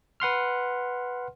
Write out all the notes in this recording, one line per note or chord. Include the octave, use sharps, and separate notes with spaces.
B4 F#5 C6 F6